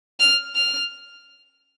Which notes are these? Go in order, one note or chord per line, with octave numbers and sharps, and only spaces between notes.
F6
F6